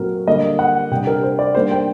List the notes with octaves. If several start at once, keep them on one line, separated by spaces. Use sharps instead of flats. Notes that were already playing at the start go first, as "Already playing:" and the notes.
Already playing: A#2 F#3 A3 C4 A#4
D3 G3 A#3 D#5
F#5
C3 G3 D4 G5
A#4
C5
D5
D#3 G3 A#3 D4 C5
G5